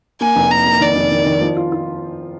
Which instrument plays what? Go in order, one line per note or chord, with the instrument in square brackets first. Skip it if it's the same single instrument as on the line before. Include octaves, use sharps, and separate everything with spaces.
[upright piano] A#3 [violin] G#5
[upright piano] F1
[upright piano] A#3 [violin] A#5
[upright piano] A#3
[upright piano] D#3 [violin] D5
[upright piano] F1
D#3
D#3
F3
F4
F4